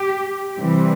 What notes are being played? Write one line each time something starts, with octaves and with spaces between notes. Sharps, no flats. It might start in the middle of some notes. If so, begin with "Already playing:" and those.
Already playing: G4
C3 E3 G3 C4